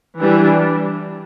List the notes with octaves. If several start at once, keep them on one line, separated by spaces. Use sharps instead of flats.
E3 G3 D4